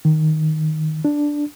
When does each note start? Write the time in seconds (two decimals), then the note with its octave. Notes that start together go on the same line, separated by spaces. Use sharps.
0.05 D#3
1.05 D4